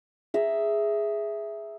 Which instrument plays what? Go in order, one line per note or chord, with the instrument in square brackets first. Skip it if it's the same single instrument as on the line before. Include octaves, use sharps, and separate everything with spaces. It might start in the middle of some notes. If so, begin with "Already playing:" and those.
[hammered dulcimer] G#4 E5 A#5